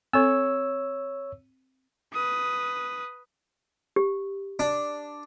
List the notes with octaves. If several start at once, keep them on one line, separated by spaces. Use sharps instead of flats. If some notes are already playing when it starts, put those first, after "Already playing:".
C4 A4 C#5 E6
B4 D#6
G4
D4